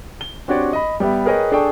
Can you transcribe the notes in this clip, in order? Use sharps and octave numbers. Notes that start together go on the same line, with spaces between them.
G7
C4 D4 F#4 G4 C#5 D5
D#5 B5
G3 B3 G4 E5
G#4 A#4 B4 C#5 D#5 G5
D4 G#4 A4 D5 G5 C#6